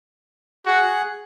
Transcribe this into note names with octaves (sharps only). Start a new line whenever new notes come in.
F#4 G#4 F#5